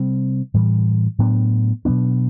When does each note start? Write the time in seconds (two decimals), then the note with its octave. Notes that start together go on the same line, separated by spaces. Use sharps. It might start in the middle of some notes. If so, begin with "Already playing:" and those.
Already playing: C3 G3 C4
0.54 A2 E3 G3
1.19 A2 F#3 B3 D4
1.85 B2 F#3 B3 D4